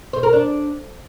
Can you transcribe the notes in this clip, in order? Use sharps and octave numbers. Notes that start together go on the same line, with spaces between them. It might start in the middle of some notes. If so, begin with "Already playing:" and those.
C5
A#4
D4